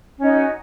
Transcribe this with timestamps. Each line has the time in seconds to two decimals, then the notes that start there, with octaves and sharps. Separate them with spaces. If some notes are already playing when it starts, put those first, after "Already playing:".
0.17 C#4
0.21 D#4
0.25 F#4